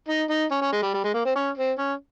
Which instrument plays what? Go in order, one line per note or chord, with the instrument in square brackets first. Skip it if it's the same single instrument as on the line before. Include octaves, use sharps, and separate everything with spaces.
[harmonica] D#4
D#4
C#4
C#4
G#3
G3
G3
G#3
A#3
C4
C#4
C4
C#4